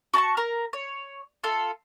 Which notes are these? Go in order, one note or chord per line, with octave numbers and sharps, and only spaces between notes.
F#4 A5 A#5 C#6
A#4 A#5
C#5
F4 A4